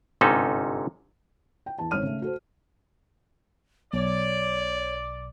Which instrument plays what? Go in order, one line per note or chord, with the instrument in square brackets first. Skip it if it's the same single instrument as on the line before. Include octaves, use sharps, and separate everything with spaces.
[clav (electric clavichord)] G1 G#2 C3 C#4 D#4 A4
[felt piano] G5
E2 A5
G#1 C#5 F6 D#7
C#3 A3
F#4 A4 C5
[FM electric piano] B1 [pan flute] C#5 [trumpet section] D5